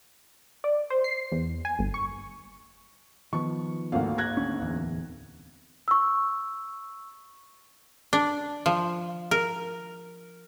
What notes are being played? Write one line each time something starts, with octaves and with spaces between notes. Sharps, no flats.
D5
C5
C7
E2
G#5
G1
C#6
D#3 F3 B3 C#6
G#1 D2 A#3 F5 F#5
F#6 G#6 A#6
D2 C#4
D1 E2
C#6 E6
D4
F3
A#4